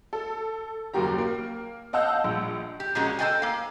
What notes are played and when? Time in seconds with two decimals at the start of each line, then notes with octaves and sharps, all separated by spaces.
0.13 A4
0.94 F#1 D#2 A#3 F#4 G4 A#5
1.18 A#3
1.93 D#5 F5 F#5 A5 E6 G6
2.24 A#1
2.80 G4
2.95 A#2 F3 G#3 A#3 C#4 F#4
3.19 A4 C5 D5 D#5 G5 G#5
3.42 A#3 F5